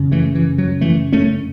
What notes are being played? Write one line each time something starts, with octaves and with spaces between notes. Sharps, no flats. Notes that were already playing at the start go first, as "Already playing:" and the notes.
Already playing: F#2 C#3
E3 A3
E3
F#3
E3 A3
A3 C#4